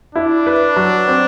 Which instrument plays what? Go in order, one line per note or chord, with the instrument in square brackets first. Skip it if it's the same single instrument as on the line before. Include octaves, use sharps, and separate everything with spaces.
[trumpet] D4 [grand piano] E4
[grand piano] B4
F#3
C4